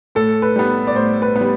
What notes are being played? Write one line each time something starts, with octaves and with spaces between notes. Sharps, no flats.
A2 A4
B4
G3 B3
D5
A2 C5
B4
B3
G3